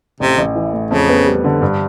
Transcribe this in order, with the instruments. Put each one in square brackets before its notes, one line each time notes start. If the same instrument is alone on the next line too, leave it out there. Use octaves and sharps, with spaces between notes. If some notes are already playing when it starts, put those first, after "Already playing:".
[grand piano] A1 [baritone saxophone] C3
[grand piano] A1
E3
A2
[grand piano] F2 [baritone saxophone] C#3
[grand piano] B3
G3
D3
G2